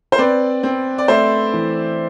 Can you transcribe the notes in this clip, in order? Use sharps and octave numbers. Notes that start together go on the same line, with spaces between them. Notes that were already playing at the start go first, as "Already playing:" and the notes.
C5
C4 B4 D5
C4
D5
A3 C5 E5
E3